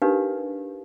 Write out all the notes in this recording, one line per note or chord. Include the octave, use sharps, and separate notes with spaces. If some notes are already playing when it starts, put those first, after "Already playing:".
D4 D#4 G4 A#4 B4 F5